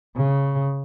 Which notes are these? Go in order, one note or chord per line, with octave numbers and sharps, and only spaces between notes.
C#3